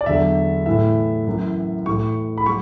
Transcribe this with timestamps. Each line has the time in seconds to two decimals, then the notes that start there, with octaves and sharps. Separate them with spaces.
0.01 D5
0.06 E2 D3 F#3 E5
0.66 A2 E3 E5
1.27 F#2 E3
1.86 A2 E3 C#6
2.38 B5
2.46 F#3 C#6